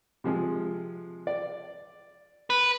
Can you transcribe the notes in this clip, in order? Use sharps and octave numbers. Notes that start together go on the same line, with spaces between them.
C3 F3 G#3
D5
B4